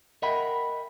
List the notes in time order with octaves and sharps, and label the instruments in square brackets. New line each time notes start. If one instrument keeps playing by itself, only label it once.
[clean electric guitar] A#4 D#5 E5 F#5 G5 B5